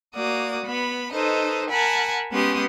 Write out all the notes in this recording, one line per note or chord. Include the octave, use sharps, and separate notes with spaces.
A#3 F#4 D5 D#6
B3 B5
D#4 A4 B4 C5 D#5
A#4 F#5 G#5 A5 B5
G#3 B3 C#4 G4 C6 D#6